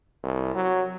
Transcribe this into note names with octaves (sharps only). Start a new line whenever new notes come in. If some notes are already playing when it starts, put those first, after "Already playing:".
C2
F#3